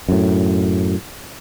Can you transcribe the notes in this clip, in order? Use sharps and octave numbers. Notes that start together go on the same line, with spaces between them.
F#2 A2